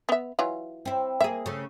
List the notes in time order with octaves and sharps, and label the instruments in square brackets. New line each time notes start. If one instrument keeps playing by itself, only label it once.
[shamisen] B3 E5
E3 F#3 F4
[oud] C4 E4
[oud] A#3 G#4 [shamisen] E5
[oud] C#3 A3